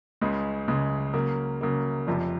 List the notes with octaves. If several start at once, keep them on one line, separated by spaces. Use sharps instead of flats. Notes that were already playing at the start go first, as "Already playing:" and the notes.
C#2 C#3 G#3
C#2 C#3 G#3
C#3 F#3 A#3
C#3 F#3 A#3
F1 F2 C3 F3